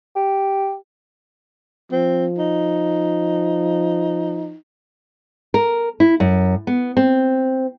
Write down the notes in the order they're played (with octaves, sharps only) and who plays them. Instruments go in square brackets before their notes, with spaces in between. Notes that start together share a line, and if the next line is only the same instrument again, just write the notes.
[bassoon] G4
[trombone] F3 [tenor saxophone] C4
[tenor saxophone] D#4
[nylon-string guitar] A#4
E4
F#2
B3
C4